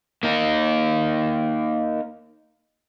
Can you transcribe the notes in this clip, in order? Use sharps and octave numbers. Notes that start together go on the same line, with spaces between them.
A#3 D#4 A#4